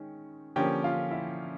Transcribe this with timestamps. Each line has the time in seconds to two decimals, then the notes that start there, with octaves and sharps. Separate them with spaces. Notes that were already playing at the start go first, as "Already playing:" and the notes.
Already playing: D#3 G#3 C#4 G5
0.56 D3 F3 A#3 C#4 G4 G5
0.84 F4 F5
1.11 E4 E5